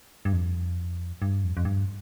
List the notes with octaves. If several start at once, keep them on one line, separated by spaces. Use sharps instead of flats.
G2
F2
G2
F2
F2
G2